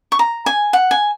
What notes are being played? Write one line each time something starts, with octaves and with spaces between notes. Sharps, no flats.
C#6
A#5
G#5
F#5
G#5